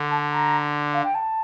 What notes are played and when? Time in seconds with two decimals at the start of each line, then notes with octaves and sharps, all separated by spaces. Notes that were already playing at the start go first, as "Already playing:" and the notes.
Already playing: D3
0.11 A5
0.32 A#5
0.94 F5
1.04 G5
1.15 A5